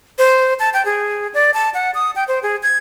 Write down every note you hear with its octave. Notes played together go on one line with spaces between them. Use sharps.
C5
A5
G5
G#4
D5
A5
F#5
D#6
G5
C5
G#4
G#6